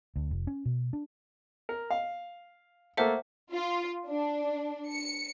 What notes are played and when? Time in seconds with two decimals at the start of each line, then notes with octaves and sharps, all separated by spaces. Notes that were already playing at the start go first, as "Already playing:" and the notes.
0.16 D2
0.31 F1
0.47 C#4
0.65 B2
0.93 D4
1.69 A#4
1.91 F5
2.97 A3 A#3 A4 C5 E5 F#5
3.52 F4
4.08 D4
4.92 C#7